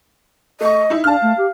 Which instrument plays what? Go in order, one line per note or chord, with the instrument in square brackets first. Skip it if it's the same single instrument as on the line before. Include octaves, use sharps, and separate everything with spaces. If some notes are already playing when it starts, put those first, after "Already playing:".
[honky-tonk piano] A3 C#6 [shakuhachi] D#5
[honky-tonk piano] D#4 E4
[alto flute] D4 [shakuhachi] F5 [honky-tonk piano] A5 F6
[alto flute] A3
G4